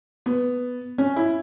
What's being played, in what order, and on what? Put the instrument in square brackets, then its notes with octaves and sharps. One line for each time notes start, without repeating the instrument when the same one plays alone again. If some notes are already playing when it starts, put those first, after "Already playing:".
[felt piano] B3
C#4
E4